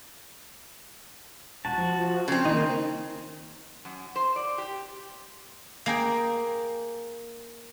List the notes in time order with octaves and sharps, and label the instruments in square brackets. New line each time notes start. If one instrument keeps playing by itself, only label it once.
[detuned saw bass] E1 [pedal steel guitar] F#4 A5
[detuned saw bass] F3
[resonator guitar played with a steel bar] C#3 C4
[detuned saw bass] D#3 [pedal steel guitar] A#3 D#4
[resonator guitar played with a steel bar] F#2
C5
D5
G4
[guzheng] A#3 G#4 G5